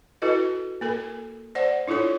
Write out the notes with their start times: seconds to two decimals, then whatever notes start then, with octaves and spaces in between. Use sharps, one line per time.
0.22 E4 F#4 A4 B4 D#5
0.81 A#3 A4 A#4
1.55 C5 D5 F#5
1.88 D4 E4 F4 A4 C#5